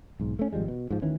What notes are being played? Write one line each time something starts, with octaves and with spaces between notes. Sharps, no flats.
B1 G#2
A3 C#4
G#1 F3 G3 G#3
B2
G#2 F3
D2 D#3 E3 C#4